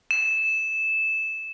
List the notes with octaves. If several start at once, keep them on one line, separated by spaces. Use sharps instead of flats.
E7